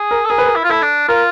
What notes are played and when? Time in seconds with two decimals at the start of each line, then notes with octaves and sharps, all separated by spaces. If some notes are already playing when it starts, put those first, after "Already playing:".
Already playing: G#4
0.11 A#4
0.25 A4
0.30 G#4 A#4
0.38 B4
0.46 A#4
0.56 E4
0.64 F4
0.70 E4 A4
0.82 D4
1.08 F4 A#4